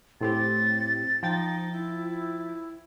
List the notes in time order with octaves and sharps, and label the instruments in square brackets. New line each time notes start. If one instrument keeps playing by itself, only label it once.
[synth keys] A2 C4 G4 [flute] A6
[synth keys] F3 G5 A6 [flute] D#4
[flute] E4